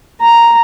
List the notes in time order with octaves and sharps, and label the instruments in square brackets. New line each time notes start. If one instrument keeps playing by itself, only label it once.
[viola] A#5